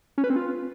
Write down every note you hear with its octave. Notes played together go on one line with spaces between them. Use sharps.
C#4
B4
C4
F4